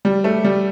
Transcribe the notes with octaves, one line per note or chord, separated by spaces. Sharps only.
G3
A3
G3